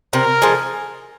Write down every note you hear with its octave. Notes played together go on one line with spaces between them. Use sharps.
C3 A#4
F3 G#3